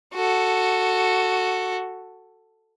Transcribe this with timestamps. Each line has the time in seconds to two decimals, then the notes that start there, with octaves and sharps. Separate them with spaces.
0.14 F#4 A4